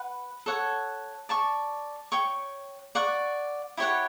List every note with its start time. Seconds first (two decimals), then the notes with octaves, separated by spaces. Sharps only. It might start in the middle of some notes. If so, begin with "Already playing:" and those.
Already playing: B4 F#5
0.46 A4 C#5 F#5
1.29 D5 A5 C#6
2.12 C#5 G5 C#6
2.95 D5 F#5 C#6
3.77 E4 G4 C#5 F#5